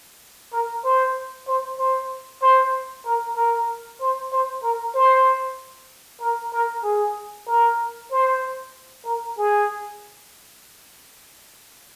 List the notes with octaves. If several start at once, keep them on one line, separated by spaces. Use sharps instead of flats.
A#4
C5
C5
C5
C5
A#4
A#4
C5
C5
A#4
C5
A#4
A#4
G#4
A#4
C5
A#4
G#4